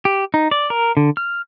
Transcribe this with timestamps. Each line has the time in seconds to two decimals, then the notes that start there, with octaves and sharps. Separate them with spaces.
0.05 G4
0.34 D#4
0.51 D5
0.70 A#4
0.97 D3
1.17 F6